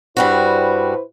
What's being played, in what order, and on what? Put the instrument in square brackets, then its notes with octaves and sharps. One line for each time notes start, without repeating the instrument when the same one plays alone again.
[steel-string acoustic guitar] G2 G3 F#4 [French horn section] E4 B4 C5